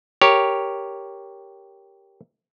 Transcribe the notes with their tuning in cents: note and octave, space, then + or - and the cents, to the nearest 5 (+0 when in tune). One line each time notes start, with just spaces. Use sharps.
G4 +0 A#4 +0 C#5 +0